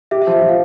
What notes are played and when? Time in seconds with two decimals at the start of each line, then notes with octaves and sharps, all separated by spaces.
0.11 G4 E5
0.22 E5
0.27 F3
0.32 E5
0.42 F3
0.49 F5